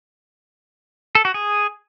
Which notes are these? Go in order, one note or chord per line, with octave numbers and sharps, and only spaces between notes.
A4
F#4
G#4